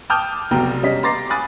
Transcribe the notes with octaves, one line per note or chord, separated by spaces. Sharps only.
G5 A5 D6 D#6 F6 G6
F1 B1 B2 F#4 G5 A#5
G3 C#4 D#5 B6
A#5 C6 D6 A6 A#6 C7
G#5 B5 D6 D#6 F#6 A6